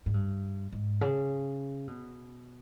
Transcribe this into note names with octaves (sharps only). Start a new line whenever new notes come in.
G#2
G2
G#2
C#3
B2